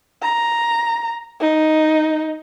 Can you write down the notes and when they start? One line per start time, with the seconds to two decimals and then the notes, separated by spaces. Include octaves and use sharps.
0.22 A#5
1.40 D#4